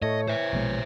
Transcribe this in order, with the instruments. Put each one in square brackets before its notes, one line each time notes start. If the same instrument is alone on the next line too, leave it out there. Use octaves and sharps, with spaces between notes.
[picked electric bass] A2 [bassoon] A3 [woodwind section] C#5 [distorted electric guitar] D#5
[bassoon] E3 [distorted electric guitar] C5 E5
[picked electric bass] A#1 B2 G#3